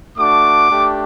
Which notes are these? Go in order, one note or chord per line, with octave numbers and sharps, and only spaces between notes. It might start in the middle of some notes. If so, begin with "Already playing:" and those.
A3 D4 F#4 D6
A3 D4 G4